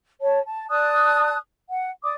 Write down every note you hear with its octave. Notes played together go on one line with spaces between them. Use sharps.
C#5 A5
A5
D5 A5 D#6 F#6
F#5
D5 D6 D#6